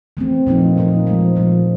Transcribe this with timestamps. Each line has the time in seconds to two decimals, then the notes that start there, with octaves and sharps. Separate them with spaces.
0.17 E3 A3 C4
0.47 A#2 F3 A#3 D#4
0.76 A#2 F3 A#3 D#4
1.06 A#2 F3 G#3
1.36 A#2 F3 G#3